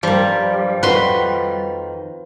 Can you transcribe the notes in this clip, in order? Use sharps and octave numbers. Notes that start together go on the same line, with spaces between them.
G2 F3 G3 A#4
F2 D#3 F#4 B4 C6